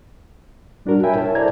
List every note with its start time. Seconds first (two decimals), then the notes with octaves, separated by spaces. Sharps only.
0.86 G3 D4 F#4 A#4
1.03 C#5 E5 G5 G#5 B5
1.15 E4 A#4 C#5 A5
1.35 A4 C5 D5 E5 A#5 G#6